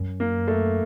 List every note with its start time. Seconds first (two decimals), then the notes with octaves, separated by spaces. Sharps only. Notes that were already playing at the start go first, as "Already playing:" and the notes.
Already playing: F#2
0.20 A#3
0.48 A3